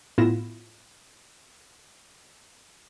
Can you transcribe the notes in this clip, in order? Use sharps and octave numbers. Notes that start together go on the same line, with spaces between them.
A2 B3 E4 F4 A#6 E7